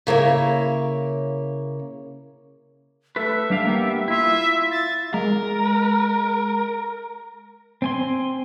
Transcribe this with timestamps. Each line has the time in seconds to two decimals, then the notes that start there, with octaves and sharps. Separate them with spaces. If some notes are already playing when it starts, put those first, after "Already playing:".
0.07 C#3 A#3 E4 C#5
3.16 A3 A4 B4 E5
3.50 G3 D4 F5
3.65 A#3 B3 G4
4.08 E4 F4 E5
4.71 A6
5.14 G#3 A#4
7.82 C4 G#5 C6